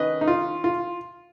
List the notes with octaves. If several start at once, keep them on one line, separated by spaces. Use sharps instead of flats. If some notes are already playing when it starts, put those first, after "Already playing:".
Already playing: D#3 C#4 B4 D#5
D#4
F4
F4